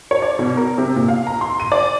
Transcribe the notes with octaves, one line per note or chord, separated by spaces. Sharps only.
C#5
D5
B2
A#4
C3
A#2
F5
A#5
C6
D#7
D5